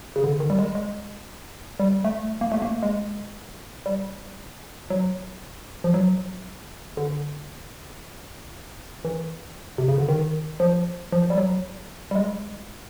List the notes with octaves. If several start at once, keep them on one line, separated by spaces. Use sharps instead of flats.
C#3
D3
D#3
G3
G#3
G#3
G3
A3
A#3
A3
A#3
G#3
G3
F#3
F3
F#3
D3
E3
C3
C#3
D3
D#3
F3
F3
G3
F#3
G3
G#3